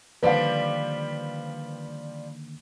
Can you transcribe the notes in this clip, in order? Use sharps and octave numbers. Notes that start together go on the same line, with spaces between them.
D3 D#3 F3 G3 A#3 B4 F5